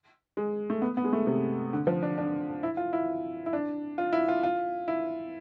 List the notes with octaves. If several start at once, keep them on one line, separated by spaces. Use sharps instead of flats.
G#3
A3
B3
B3
G#3
A3
C3
D3
F3
D4
D4
E4
F4
E4
E4
D4
F4
E4
F4
F4
E4